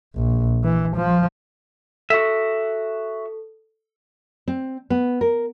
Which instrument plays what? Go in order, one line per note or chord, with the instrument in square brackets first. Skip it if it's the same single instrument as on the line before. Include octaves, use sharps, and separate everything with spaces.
[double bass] A#1
E3
F3
[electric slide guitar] F#4 E5 [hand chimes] A4
[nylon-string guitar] C4
B3
A#4